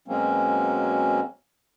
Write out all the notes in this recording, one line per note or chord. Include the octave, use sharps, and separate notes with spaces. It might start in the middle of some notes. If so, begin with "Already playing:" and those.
B2 F#3 G#3 A#3 C4 C#4